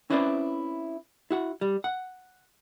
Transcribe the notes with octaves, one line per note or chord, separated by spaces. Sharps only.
C4 C#4 E4 B4 C5 D5
E4 F#4 F#5
G3
F#5